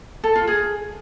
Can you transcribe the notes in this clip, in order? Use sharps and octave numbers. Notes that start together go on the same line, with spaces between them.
A4
F4
G#4